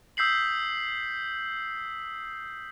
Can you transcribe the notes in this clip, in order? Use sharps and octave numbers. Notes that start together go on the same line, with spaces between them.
D#6 E6 G6 B6 C7 F#7